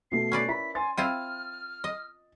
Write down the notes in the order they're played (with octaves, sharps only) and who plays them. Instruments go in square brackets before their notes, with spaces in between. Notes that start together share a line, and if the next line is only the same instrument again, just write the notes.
[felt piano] B2 A3 [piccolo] C7
[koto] C#4 B4 D5
[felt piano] E4 A#4 B5 [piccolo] B6
[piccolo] G#5 [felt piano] C6 A6
[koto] C4 E4 F4 [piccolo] F6 [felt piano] D#7
[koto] D#5